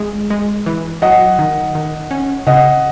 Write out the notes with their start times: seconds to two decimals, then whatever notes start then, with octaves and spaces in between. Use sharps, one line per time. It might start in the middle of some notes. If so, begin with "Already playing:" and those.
Already playing: G#3
0.30 G#3
0.66 E3
1.02 F#3 D#5 F#5
1.39 D#3
1.75 D#3
2.11 C#4
2.47 C#3 D#5 F#5